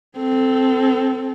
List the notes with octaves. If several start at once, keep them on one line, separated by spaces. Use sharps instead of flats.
C4 A4